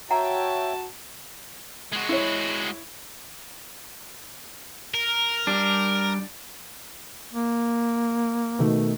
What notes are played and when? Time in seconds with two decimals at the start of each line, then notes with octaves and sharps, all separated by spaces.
0.11 F#4 C#5 E5 F#5 G5 A5 A#5
1.93 G#3 F#4
2.09 E4 C#5
4.94 A#4
5.47 G3 D4
7.33 A#3
8.59 B2 D#3 A3